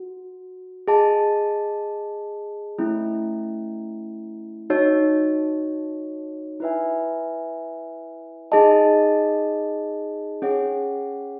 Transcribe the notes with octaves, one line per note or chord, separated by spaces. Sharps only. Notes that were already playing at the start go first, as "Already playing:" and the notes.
Already playing: F#4
G#4 D#5 A5
A3 C#4 E4
D#4 F#4 C#5
E4 B4 E5 G#5
D#4 G#4 D#5 A5
C#4 G#4 C#5 F#5